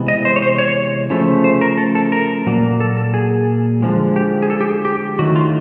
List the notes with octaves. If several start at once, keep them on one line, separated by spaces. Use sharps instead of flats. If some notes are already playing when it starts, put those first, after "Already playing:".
Already playing: C3 E3 G#3 B3
D#5
C5
C#5
C5
C#5
C#3 F3 A3
C5
A#4
A4
A4
A#4
A#2 F#3 A#3
A4
A4
G#4
D3 F3 G#3
G4
G#4
A4
G4
G#4
G4
D#3 F#3 A3 F#4
F4